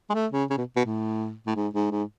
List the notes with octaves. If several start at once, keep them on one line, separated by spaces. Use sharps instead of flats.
G#3
A3
C#3
C#3
B2
B2
A2
A2
G#2
G#2
G#2